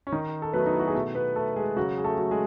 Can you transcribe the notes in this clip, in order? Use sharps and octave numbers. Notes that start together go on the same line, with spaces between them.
C#4
D#3 D#4
A4
F#3 A3 B3 B4
D#4
E4
F#4
G#4
B2 A3 A4
B3 B4
A3 A4
G#3 G#4
C#3 F#3 F#4
G#4
A3 A4
F#3 A3
G#3 G#4